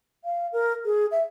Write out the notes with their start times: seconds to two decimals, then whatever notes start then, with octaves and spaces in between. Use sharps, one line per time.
0.25 F5
0.53 A#4
0.85 G#4
1.11 E5